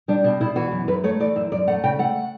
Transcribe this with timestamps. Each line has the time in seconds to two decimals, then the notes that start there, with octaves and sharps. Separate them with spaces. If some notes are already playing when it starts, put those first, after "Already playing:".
0.08 G3 D4
0.24 B2 D4
0.41 B2 E4
0.56 E3 F#4
0.72 F#2
0.88 F#2 B4
1.04 A3 C#5
1.20 E3 D5
1.36 F#2 E5
1.52 F#2 D5
1.67 A3 F#5
1.84 C#3 G5
1.99 A3 F#5